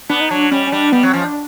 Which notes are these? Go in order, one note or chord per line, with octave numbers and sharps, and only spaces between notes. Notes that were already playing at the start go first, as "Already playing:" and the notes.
B3 D4
D#4
F#3 D4
G3 C#4
C#4
G3 D4
G3 B3
F#3 C4
F3 C#4
D4